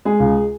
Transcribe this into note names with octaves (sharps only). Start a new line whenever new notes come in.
G#3 G#4
C#2